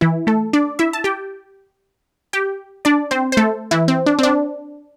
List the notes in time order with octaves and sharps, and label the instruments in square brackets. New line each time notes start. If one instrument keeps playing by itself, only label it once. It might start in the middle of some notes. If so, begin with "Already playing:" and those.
[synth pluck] E3 E4
A3 A4
D4 D5
E4 E5
A5
G4 G5
G4 G5
D4 D5
C4 C5
C5
A3 A4
E3 E4
C4
D4
C4
D4